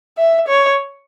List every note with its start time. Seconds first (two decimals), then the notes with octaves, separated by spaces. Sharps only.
0.18 E5
0.48 C#5